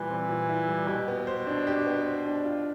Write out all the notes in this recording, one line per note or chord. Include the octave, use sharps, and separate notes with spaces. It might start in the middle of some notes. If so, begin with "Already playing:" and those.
Already playing: A#2 E3 G3 E4
C4
A#2
E4
G3
B2 G4
B3
C5
D4
G4
B3
C5
D4
F4